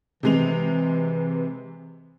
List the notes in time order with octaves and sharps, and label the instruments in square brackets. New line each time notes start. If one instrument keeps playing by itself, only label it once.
[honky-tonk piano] C3 G#3 F7 [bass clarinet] E3